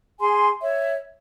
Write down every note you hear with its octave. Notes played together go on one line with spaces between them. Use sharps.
G#4 G#5 C6
C#5 E5